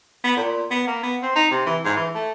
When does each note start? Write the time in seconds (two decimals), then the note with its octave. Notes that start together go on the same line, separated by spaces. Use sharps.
0.24 B3
0.37 A#2
0.71 B3
0.87 A#3
1.03 B3
1.22 C4
1.35 D#4
1.51 C3
1.66 E3
1.84 G#2
1.96 E3
2.15 A3